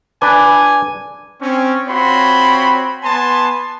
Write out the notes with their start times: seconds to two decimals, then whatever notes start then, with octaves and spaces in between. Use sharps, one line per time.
0.22 D4 B4 G#5 D6
1.41 C4 C#4
1.88 C4 F4 F#4 C#5 B5 C6
3.03 B3 G#5 A5 C6